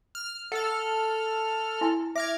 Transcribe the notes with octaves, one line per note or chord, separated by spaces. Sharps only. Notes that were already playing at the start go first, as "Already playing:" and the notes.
F6
A4 F#5 F6
E4 G#5 C6
E5 D6 F6 G#6